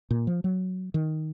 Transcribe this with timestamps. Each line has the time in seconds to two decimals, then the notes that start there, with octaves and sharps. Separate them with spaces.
0.11 A#2
0.27 F3
0.44 F#3
0.94 D#3